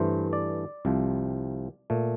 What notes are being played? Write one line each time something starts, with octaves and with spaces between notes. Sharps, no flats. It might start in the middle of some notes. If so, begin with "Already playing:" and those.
Already playing: G2 E3 A3 C5
D5
C2 C3 F3
A#2 A3